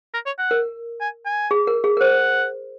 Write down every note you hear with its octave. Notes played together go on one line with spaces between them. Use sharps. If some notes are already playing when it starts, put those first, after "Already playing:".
A#4
C#5
F#5
A#4
G#5
G#5
G#4
A#4
G#4
A#4
C5 F#5